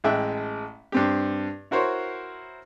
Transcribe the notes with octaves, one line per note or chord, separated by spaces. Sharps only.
A1 G#3 E5 G5 A5 F#6
G2 C4 G4
E4 F#4 A#4 C5 C#5